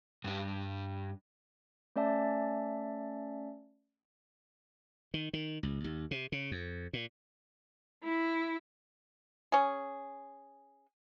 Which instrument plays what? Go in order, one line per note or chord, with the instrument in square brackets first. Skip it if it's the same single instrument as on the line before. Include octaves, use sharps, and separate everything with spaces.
[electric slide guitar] G2 D4
[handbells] A3 C#4 D5 E5 A5
[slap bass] D#3
D#3
C#2
D#2
C3
C#3
F2
A#2
[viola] E4
[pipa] C#4 G#4